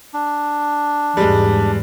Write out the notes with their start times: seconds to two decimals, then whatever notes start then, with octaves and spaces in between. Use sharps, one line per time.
0.14 D4
1.17 E2 G#2 G3 G#3